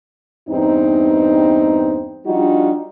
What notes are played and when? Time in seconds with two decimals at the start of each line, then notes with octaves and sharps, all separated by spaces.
0.49 E2 G2 C4 D#4
2.26 F3 G3 D4 D#4 F4 F#4